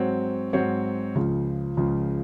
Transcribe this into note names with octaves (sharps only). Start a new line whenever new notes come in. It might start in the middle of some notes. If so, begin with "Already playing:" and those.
Already playing: G#2 F#3 C4 F#4 C#5
G#2 F#3 C4 F#4 C#5
C#2 C#3 F3
C#2 C#3 F3